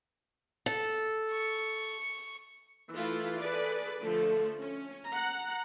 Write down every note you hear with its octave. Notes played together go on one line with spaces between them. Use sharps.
A4
C#6
E3 A3 E4 F4
G#4 A4 B4 D5
D3 F3 A3 A4
C#4
F#5 A#5